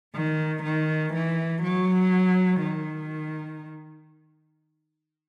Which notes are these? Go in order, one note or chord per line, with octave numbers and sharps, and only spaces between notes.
D#3
D#3
E3
F#3
D#3